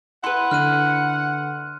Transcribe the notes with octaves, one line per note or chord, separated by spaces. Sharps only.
E4 B4 F#5 C6
D3 F6 F#6 D#7